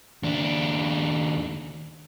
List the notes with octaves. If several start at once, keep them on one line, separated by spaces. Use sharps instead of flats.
D#2 D4